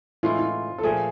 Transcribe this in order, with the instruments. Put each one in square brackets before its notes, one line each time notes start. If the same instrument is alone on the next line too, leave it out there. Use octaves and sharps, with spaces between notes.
[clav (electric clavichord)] A2 E3 G#3 C#4 E4 [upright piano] F4
[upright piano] F4
A4
[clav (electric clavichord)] A#2 F3 A3 [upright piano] G#4